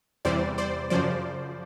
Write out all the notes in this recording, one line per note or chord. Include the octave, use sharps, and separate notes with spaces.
E2 C3 E3 G3 C5 D5
C5 D5
F#2 C#3 F3 C5 D5